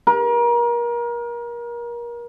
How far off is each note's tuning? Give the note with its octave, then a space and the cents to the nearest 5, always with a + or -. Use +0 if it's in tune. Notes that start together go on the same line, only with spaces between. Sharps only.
A#4 +30